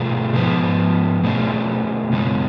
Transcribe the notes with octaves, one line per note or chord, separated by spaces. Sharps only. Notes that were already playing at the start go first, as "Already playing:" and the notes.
Already playing: B2 A3 F4 G#4
G#2 F3 B3
B2 A3 C#4 G#4
F#2 C#3 G#3